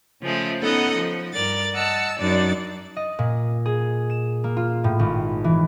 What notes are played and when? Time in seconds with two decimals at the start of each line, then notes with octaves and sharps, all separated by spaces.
0.22 C#3 F3 G#3 A3
0.61 B3 C#4 D#4 A4 D#5 F#5
0.96 F3
1.33 G2 A#4 D5 A6
1.73 D#5 F#5 A5 E6
2.18 F#2 F#3 D4 D#4 D5 A6
2.96 D#5
3.19 A#2
3.66 G#4
4.10 E7
4.44 A#3
4.57 F4
4.84 A2
4.99 G#1
5.44 E3